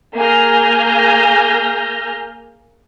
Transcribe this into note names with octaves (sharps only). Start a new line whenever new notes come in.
A#3 G#4 G#5 F6 G6 A#6